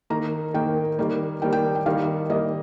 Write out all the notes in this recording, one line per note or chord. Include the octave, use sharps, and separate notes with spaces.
D#3 A#3 A#5
D#3 A#3 G5
D#3 G3 A#3
D#3 G3 A#3 G5
G5
G5
D#3 G3 A#3 F5
D#3 G3 A#3 D#5